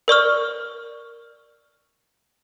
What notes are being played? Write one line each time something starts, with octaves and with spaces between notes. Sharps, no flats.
A#4 D5 C#6 F6